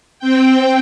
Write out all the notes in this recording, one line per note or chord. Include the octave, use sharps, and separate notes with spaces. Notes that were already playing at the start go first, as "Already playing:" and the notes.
C4 G5